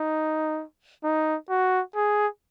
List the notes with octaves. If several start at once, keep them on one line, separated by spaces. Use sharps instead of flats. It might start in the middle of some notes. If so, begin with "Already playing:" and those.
Already playing: D#4
D#4
F#4
G#4